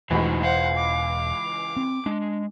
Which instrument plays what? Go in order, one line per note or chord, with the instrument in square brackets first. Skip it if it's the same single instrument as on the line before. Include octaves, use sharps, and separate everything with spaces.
[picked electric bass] E1 [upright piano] C#2 E3 [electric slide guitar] A2 D#4 C5 [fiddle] F#4
[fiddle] C5 F#5 [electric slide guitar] F5
[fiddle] D6
[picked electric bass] C4
[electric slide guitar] G#3 [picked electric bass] D4